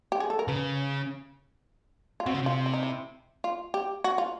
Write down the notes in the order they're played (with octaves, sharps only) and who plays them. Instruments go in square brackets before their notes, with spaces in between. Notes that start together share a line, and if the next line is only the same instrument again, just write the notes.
[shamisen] G4
G#4
A4
A#4
[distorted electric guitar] C#3 [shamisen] B4
[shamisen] F4
[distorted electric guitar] C3 [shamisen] F#4
[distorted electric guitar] C#3
[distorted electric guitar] C3 [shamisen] F4
[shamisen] E4
D#4
E4
F4
G4
F#4
F4